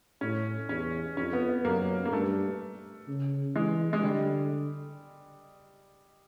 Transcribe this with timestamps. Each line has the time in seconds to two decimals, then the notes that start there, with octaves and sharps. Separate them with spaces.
0.21 A2 C#4
0.69 E2 C#4
1.17 F2 C#4
1.33 B3
1.49 B3
1.65 F#2 A#3
2.05 A#3
2.12 G2 A3
3.08 C#3
3.55 E3 G#3
3.93 G#3
4.03 D3 G3